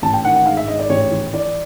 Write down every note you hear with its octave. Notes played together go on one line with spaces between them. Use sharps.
A1 A5
G5
D#3 F#5
F#5
G#2 F5
E5
G#2 D#5
D5
A1 C#5
E3
E3 D5